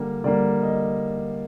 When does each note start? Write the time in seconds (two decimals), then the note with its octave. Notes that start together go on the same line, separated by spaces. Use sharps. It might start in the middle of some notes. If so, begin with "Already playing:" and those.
Already playing: D3 G3 A#3
0.24 D3 G3 A#3 D5
0.63 D#5